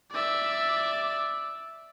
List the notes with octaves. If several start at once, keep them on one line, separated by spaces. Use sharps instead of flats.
D5 E5